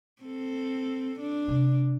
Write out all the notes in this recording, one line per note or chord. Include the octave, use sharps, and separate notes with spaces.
C4 A4
D4
C3 D#3